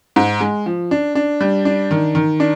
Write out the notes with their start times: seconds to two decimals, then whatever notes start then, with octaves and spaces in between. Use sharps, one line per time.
0.16 G#2
0.40 G#3
0.66 F3
0.91 D4
1.15 D4
1.41 G3
1.65 D4
1.91 D#3
2.15 D#3
2.40 D4